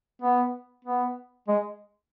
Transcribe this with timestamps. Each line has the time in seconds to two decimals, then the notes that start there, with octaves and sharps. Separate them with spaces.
0.22 B3
0.85 B3
1.48 G#3